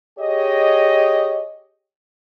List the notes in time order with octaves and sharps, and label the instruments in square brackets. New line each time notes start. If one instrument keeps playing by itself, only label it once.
[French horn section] G4 G#4 C#5 D#5